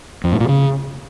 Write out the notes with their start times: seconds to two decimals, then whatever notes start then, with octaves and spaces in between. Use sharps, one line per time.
0.24 F2
0.32 A2
0.40 A#2
0.48 C#3